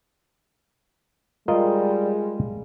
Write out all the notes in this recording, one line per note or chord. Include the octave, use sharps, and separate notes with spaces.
G3 G#3 F4 A#4 D#5